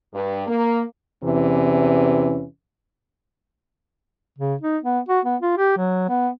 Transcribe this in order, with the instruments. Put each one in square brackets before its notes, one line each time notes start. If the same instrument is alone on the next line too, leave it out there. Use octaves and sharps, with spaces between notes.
[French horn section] G2
A#3
E2 C3 E3 C#4
[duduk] C#3
D#4
B3
F#4
B3
F4
G4
F#3
B3